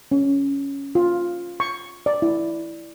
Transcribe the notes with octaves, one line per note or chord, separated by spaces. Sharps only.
C#4
F4
C#6
D5
E4